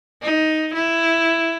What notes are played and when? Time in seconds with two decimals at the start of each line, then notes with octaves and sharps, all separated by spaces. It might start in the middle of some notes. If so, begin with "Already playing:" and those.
0.22 D#4
0.74 E4